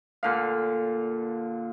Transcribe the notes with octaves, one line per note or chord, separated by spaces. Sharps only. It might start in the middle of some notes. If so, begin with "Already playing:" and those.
A#2 D3 F5